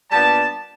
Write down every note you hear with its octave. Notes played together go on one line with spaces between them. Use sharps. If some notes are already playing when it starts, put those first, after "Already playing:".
A#2 G3 B3 D4 A5